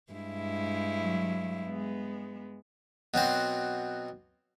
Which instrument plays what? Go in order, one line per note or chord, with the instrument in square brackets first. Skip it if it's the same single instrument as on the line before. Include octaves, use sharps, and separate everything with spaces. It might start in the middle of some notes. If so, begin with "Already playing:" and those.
[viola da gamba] G2 G#3 E4
[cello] F#3
G#3 B3
[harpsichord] B2 F#3 C4 C5